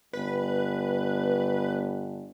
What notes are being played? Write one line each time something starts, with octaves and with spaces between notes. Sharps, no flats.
G1 B4